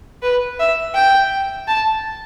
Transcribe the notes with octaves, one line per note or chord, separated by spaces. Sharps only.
B4
E5
G5
A5